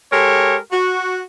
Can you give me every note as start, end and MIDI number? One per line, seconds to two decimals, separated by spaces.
0.12 0.57 56
0.12 0.57 67
0.12 0.57 69
0.12 0.57 70
0.12 0.57 73
0.72 1.22 66